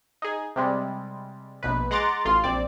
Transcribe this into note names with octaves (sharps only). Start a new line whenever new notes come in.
D#4 G#4
C3 G3 G#3
A#1 B2 B4
G#3 F#5 A#5 C6 D6 A6
A1 F4 C6
A#1 C4 D5